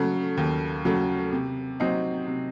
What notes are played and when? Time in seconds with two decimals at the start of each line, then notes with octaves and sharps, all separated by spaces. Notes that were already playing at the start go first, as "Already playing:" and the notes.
Already playing: C#3 F#3 A3
0.37 D#2
0.85 C#3 F#3 A3
1.32 C3
1.80 F#3 C4 D#4
2.27 C3